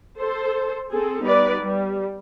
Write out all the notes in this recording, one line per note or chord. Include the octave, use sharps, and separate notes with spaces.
A4 C5
C4 G#4 A4
G3 B3 D#4 B4 D5
G3